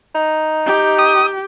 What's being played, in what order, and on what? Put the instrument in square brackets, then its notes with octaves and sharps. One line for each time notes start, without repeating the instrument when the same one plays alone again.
[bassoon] D#4
[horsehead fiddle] G4
[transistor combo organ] D#6